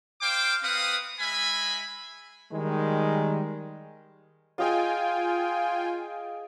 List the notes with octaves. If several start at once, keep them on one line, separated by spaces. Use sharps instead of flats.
C5 F5 G5 D6
C4 B4 F5 F#5 D#6
G#3 E5 G#5 B5
D#3 G3 G#3
F4 G#4 D#5 F5 G5 G#5